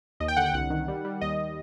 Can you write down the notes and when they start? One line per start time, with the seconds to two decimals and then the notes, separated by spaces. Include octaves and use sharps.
0.20 D#2 D#5
0.28 G5
0.37 D3 F#5
0.46 G5
0.54 C2 F#5
0.70 D#3
0.88 G3
1.05 G3
1.21 D#2 D#5